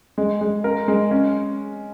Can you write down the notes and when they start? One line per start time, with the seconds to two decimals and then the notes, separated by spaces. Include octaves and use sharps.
0.18 G#3
0.41 G#3
0.64 A#4
0.88 G#3
1.11 C#4